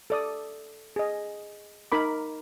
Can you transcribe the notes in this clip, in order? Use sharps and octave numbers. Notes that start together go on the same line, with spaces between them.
A4 D5 D#6
G#4 D#5
D#4 A#4 B5 D6